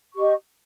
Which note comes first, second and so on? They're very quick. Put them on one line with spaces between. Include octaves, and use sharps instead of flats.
C#6 G4 D#5